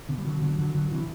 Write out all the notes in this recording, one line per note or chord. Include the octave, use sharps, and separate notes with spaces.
B2 D3
G3
D3 F#3
D3 F#3
D3 F#3
D3 F#3
C3 E3